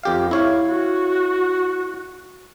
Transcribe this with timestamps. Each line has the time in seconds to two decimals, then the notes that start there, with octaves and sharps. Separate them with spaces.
0.03 F2 G4 F5
0.31 E4 C#5 F5
0.68 F#4